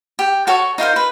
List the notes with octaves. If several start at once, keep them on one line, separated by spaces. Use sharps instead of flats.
G4
F#4 A4 C#5 C#6
D#4 F4 A#4 C5
B4